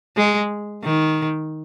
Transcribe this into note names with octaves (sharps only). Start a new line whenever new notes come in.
G#3
D#3